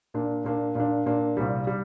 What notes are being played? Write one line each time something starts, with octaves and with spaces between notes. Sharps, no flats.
A#2 A#3 D4
A#2 A#3 D4
A#2 A#3 D4
A#2 A#3 D4
C2 A#2 G3
G3